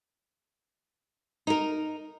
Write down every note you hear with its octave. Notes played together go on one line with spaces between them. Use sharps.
D#4 A#4